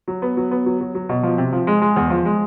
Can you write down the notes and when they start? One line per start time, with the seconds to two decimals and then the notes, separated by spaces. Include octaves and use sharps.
0.08 F#3
0.22 B3
0.37 F#3
0.51 B3
0.66 F#3
0.81 F#3
0.95 F#3
1.09 B2
1.23 F3
1.38 C3
1.53 F3
1.67 G#3
1.81 G#3
1.96 E2
2.10 F3
2.25 G#3